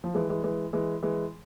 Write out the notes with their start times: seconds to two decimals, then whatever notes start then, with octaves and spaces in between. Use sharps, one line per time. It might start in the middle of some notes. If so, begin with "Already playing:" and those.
0.04 F3
0.14 E3 G#3
0.30 E3 G#3
0.44 E3 G#3
0.73 E3 G#3
1.03 E3 G#3